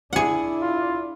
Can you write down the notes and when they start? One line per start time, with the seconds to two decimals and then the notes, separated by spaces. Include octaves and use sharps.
0.13 D4 E4 G#4 F#5
0.62 F4